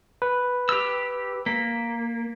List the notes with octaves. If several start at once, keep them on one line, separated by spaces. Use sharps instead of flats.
B4
G4 E6
A#3 B6